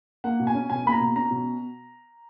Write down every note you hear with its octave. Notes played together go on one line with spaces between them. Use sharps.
A#3 F#5
B2
G#5
C#4
B2 G#5
A#3 B5
A#5
B2
C#4 A#5
B2